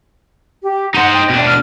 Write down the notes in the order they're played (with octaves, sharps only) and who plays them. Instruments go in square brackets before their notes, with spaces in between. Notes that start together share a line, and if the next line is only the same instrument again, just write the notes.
[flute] G4
[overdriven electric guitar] D#4 C5 [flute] F#5
[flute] G5
[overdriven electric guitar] B2 D4
[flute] F6